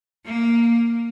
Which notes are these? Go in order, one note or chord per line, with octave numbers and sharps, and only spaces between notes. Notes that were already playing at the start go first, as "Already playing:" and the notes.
A#3